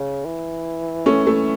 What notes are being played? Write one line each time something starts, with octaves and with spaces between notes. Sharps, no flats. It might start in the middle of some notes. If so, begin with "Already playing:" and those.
Already playing: C#3
E3
A3 C#4
A3